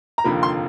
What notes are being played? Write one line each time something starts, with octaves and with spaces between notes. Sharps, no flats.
A#5
F1 D#2 D3 F3 A#3 B5
C6